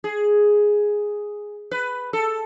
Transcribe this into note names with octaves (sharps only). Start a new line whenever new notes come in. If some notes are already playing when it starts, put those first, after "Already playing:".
G#4
B4
A4